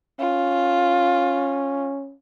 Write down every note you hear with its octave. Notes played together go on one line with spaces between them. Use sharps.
C#4 F4